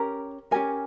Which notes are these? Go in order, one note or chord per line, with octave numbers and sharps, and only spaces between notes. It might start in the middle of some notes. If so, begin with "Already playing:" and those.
Already playing: C#4 G4 A#4 A#5
C#4 G4 A#4 G#5